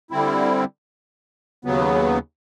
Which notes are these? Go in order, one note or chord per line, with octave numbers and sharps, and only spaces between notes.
D3 G3 C4 E4
D#2 C#3 F#3 B3